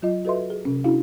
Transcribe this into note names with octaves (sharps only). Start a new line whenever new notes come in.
F#3 F4 D#5
F#4 A4 B4 D#5 E5 C6
G#4
C3 C#4
C#4 D4 E4 F#4 G#4 F5